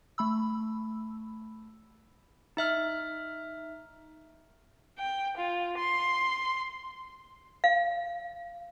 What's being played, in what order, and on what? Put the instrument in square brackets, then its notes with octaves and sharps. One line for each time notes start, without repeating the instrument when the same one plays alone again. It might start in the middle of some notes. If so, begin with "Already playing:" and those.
[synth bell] A3 B5 E6
[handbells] D#4 E5 F6
[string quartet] G5
F4
C6
[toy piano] F5